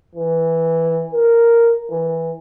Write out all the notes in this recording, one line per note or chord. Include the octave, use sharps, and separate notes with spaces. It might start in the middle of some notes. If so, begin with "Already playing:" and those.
E3
A#4
E3